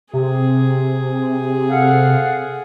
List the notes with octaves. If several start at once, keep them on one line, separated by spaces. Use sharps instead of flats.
C3 G#4
A4 F5 F#5